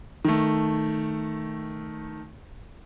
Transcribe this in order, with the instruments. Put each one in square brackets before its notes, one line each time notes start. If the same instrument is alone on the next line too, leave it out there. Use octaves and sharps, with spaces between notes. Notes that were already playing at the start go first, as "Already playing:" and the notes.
[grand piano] D#3 A3